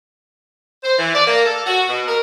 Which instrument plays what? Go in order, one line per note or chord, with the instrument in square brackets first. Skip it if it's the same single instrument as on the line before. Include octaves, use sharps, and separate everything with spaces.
[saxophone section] C5
E3
D5
A#3
A4
F#4
B2
A#4